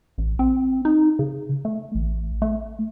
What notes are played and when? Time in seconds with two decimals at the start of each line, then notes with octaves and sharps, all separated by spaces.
0.18 A1
0.39 C4
0.85 D#4
1.19 C#3
1.65 A3
1.95 A1
2.42 A3